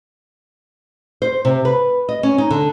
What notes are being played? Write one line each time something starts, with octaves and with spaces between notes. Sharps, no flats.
C5
C3
B4
D#5
C#4
D#4
D3